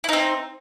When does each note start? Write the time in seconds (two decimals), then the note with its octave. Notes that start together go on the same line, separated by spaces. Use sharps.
0.04 E4
0.09 D#4
0.13 C4